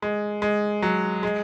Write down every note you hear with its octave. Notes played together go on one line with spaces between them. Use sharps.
G#3
G#3
F#3
G#3